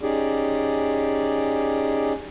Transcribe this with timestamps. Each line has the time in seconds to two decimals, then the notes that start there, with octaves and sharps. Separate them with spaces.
0.02 C#4 D#4 G4 G#4 D5